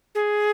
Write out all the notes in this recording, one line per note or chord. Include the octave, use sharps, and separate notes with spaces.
G#4